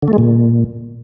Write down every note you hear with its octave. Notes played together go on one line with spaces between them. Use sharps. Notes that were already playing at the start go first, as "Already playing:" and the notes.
D3
A3
G#3
A#2